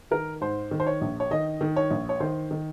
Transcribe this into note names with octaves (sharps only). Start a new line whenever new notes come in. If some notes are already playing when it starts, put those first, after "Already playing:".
D#3 A#4
G#2 C5
D#3
C5
C#5
A#1
C#5
D#3 D#5
D#3
C#5
A#1
C#5
D#3 C5
D#3